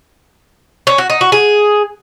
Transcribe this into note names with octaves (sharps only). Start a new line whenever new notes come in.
C#4
F#4
D#4
F#4
G#4